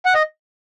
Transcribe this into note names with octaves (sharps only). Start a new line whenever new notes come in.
F#5
D#5